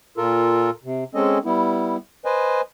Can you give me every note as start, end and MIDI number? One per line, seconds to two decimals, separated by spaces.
0.17 0.70 46
0.17 0.70 65
0.17 0.70 69
0.17 0.70 70
0.84 1.04 48
1.15 1.38 56
1.15 1.38 60
1.15 1.38 61
1.15 1.38 69
1.15 1.38 75
1.45 1.97 55
1.45 1.97 59
1.45 1.97 64
2.25 2.61 71
2.25 2.61 72
2.25 2.61 75
2.25 2.61 80